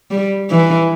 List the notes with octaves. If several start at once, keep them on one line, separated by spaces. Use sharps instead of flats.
G3
E3